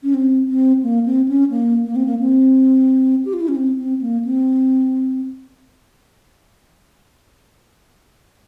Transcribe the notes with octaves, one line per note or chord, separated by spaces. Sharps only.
C#4
C4
C4
A#3
C4
C#4
A#3
A#3
C4
A#3
C4
G4
F4
E4
C#4
C4
C4
A#3
C4